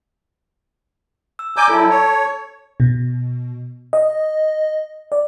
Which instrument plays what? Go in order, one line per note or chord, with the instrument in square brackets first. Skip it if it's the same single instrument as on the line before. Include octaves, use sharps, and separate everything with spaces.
[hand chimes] E6
[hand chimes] D5 A#5 E6 [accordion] G#5 D6 G6
[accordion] F#3 E4 [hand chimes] A4 A5
[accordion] C#5
[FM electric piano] B2
D#5
D5